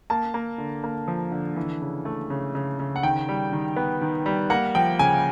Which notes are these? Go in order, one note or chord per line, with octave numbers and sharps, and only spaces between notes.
A#3 A5
A#3
D3
A#3
F3
D3
E3
C#3
A3
C#3
C#3
C#3
F#5
D#3 G5
G3
D#3
B3
D#3
G3
A#3 F#5
F3 G5
C#3 G#5